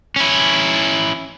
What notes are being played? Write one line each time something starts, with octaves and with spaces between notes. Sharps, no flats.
C#4 E4